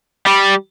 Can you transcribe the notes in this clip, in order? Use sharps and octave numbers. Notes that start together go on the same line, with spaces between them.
G3